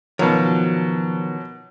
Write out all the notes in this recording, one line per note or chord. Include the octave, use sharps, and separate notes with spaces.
B2 D#3 F3 F#3 B3 A#4